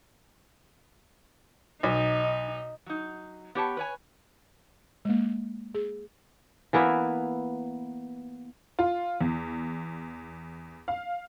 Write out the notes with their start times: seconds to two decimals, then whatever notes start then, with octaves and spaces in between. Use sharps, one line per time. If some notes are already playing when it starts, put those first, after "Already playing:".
1.83 B1 D#4
2.86 F#3 D#4
3.55 B3 G4 C#5 A5
3.77 B4 C#5 G#5
5.05 G#3 A#3
5.75 G#4
6.73 E3 A#3 B3 E4
8.79 F4
9.21 E2
10.88 F5